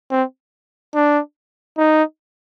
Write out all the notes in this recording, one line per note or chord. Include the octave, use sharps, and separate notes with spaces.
C4
D4
D#4